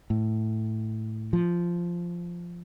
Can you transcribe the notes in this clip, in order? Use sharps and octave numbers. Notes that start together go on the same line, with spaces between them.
A2
F3